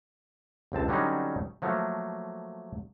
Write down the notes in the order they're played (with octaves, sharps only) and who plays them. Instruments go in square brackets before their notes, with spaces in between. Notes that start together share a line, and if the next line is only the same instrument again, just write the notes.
[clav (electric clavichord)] G1 C#2 C4 A5
D3 F#3 G3 C4 C#4 D#4
F3 F#3 A3 A#3